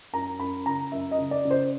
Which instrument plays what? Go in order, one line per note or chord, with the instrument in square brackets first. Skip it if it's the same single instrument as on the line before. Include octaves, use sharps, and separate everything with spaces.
[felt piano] F#2 A#5
F#2 B5
C#3 A#5
F#2 E5
D#5
C#3
D5
C#3
C5